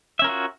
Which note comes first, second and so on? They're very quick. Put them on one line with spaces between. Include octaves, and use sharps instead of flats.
E5 C#4 A#4 F4 F#4